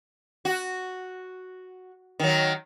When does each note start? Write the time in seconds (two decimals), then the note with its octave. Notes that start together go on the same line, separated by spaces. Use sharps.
0.45 F#4
2.19 D#3 F#3